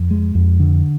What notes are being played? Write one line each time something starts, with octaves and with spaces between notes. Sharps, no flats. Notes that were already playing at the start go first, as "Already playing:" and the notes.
Already playing: F2
G#3
F2
D3